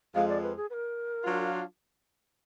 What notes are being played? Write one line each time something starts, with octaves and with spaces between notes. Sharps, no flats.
F2 F3 G#3 F5
D5
B4
G#4
B4
A#4
F#3 D4 F4